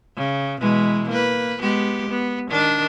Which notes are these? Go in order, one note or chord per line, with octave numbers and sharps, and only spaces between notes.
C#3
B2 E3 G#3
A#3 B4
G#3 B3 G4
B3
D#3 D4